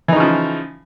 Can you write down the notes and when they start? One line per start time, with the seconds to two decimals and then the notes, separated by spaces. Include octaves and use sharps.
0.08 E3
0.12 D#4
0.16 C#3
0.20 F3